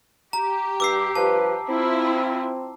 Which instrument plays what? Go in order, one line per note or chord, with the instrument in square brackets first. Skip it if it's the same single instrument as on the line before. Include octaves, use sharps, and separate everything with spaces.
[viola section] G4 [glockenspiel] A#5
[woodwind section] G2 [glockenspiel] D6 E6 C7
[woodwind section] G2 F3 B4 [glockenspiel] A5
[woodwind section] C4 [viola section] E4 F4